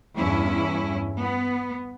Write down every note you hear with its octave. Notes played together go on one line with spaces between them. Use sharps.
E2 G2 C#4 E4
B3